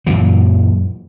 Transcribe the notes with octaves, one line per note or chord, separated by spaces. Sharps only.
F#2 A#2 E3 F#3